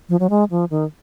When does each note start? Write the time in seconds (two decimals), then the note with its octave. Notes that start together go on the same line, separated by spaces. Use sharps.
0.09 F3
0.20 F#3
0.30 G#3
0.51 F3
0.70 D#3